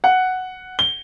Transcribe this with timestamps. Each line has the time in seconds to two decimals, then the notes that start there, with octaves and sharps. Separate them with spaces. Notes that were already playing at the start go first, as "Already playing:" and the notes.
0.04 F#5
0.79 G7